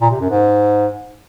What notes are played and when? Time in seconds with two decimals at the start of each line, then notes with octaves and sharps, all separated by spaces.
0.01 A#2
0.11 C3
0.20 F#2
0.30 G#2